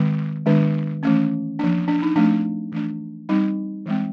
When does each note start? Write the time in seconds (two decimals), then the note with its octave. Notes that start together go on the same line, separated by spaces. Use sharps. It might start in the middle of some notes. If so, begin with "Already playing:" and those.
Already playing: D#3 G#3 C4
0.46 D#3 G#3 B3 D4
1.03 E3 A3 C#4
1.59 F3 A#3 D4
1.88 D4
2.02 D#4
2.15 F3 A3 C4 D4
2.72 E3 A3 D4
3.29 G3 C4 D#4
3.86 E3 G#3 C4